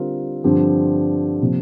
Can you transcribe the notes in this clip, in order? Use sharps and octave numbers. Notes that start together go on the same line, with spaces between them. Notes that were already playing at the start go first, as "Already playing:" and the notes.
Already playing: D3 G3 C4 F4 A#4
G2 D3 F3 C4 G4
C3 F3 A#3